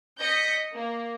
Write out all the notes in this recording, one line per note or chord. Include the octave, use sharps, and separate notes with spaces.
D#5 G6 A#6 B6 C#7
A#3